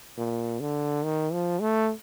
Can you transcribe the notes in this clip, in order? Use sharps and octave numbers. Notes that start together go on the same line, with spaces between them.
A#2
D3
D#3
F3
A3